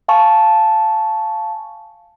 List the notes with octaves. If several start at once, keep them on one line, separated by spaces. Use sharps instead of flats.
F5 G#5 A5 C#6